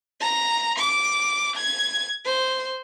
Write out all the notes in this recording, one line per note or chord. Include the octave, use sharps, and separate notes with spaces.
A#5
D6
G#6
C5